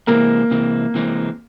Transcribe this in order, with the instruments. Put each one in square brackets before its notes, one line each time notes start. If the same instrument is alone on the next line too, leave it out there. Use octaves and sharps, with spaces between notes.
[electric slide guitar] C3 E3 G#3 C4 [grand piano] A#3
[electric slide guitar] C3 E3 G#3 C4
C3 E3 G#3 C4